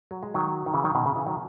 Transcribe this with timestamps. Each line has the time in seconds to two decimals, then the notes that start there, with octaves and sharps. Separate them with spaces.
0.11 F#3
0.23 G#3
0.34 D#3 F#3
0.66 D#3
0.74 C#3 E3
0.84 D#3 F#3
0.95 B2 D#3
1.06 C#3
1.16 C#3 E3
1.26 D#3 F#3